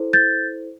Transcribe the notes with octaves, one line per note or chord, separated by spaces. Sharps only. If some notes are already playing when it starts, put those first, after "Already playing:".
Already playing: E4 A4 C5
G6 A6